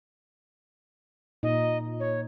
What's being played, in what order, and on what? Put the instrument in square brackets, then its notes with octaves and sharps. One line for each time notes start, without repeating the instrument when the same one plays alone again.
[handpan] A#2 D#4 [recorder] D#5
[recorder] C#5